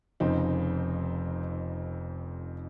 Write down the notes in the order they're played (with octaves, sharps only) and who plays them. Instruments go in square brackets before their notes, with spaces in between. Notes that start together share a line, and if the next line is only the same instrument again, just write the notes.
[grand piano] F1 F2 C#3 C4 D#4